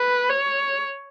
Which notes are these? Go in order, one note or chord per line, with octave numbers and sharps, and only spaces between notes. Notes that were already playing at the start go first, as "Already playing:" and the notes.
Already playing: B4
C#5